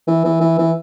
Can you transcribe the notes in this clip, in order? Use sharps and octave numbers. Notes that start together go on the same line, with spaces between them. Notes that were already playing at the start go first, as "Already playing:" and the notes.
E3
E3
E3
E3